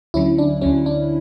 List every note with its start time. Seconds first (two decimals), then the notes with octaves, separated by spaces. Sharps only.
0.14 D2 D3 F#3 C#4 E4
0.38 D4
0.61 D2 D3 F#3 C#4
0.86 D4